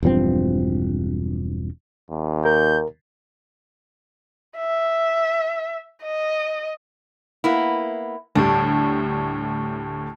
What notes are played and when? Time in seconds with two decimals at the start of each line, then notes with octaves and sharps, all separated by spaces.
0.03 E1 G2 F3 C4
2.11 D#2
2.45 A#4 G6
4.58 E5
6.02 D#5
7.44 A#3 B3 E4
8.35 D2 A2 G3 D4